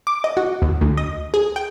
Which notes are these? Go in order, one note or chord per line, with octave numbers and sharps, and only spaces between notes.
D6
D#5
F#4
D#2
D2
D#5
G#4
G5